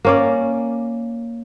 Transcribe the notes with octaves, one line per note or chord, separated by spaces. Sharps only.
A#3 C#4 D5